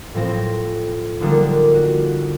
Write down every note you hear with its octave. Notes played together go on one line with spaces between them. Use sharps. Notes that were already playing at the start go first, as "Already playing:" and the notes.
A2 F3 C4 A#6
D3 F3 G3 A#3 D4 D#4
F#4